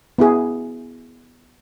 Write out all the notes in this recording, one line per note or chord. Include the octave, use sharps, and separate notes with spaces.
B3 E4 G#4